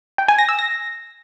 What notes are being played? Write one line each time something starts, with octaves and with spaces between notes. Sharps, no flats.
G5
G#5
A#6
E6
A#6